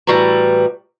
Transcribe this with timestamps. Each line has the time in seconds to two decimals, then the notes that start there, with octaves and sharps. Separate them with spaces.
0.07 A2 E3 G3 F#4 B4 A#5